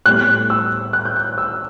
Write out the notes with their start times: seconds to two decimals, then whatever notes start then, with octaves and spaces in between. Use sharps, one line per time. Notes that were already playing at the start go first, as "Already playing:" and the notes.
0.06 A2 G3 B3 F#6
0.50 E6
0.93 F#6
1.05 G6
1.16 F#6
1.38 E6